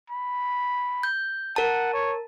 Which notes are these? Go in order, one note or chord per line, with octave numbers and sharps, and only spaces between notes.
B5
G6
A#4 F#5 A5
C#5